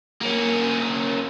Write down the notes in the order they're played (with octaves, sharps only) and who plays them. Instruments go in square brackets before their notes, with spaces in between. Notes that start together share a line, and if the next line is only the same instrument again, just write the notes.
[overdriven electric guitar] A#3 C#4